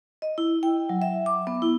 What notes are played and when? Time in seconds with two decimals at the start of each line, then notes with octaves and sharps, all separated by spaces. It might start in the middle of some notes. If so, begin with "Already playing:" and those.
0.22 D#5
0.38 E4
0.63 G5
0.89 F#3
1.02 E5
1.26 D6
1.47 B3
1.62 E4